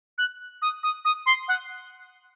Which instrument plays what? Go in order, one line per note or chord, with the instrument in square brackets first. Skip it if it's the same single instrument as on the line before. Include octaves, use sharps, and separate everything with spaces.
[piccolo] F#6
D#6
D#6
D#6
C6
F#5